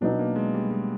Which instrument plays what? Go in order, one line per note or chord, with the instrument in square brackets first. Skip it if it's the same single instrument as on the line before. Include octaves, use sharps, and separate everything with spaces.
[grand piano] B2 F#3 B3 D#4 [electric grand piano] D4
[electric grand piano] A#3
G#3
G3
G#3